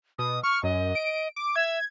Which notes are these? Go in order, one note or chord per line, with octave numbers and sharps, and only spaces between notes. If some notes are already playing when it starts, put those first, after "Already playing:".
B2 D#6
C#6 F6
F#2 D#5
D7
D6
E5 G#6